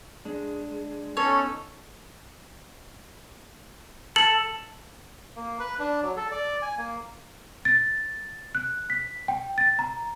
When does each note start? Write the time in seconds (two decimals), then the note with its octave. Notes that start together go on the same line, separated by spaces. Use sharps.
0.25 G#3 D4
1.17 B3 C#4 D#4 A4 C#5
4.16 A4 F#7
5.36 A#3
5.60 B4
5.79 D4
6.02 F#3
6.16 A4
6.31 D5
6.62 G#5
6.77 A#3
7.65 A6
8.55 F#6
8.90 B6
9.28 G5
9.58 A6
9.79 A#5